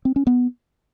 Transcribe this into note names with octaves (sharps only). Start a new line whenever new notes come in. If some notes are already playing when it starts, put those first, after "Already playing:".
C4
C#4
B3